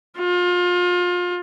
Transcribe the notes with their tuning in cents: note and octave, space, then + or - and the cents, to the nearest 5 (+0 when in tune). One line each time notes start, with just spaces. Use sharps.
F4 +30